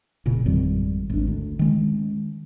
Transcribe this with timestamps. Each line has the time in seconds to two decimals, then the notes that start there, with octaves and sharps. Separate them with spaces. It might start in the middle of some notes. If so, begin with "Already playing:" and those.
0.26 F1 A#2 C#3
0.45 G#1 F2 D#3 G3
1.10 G#1 D#2 D4
1.27 D2
1.59 D#3 G#3 C#4